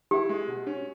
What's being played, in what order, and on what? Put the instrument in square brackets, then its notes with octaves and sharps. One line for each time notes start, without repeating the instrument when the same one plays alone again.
[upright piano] E4 [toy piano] G4
[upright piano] G#3
B2
C#4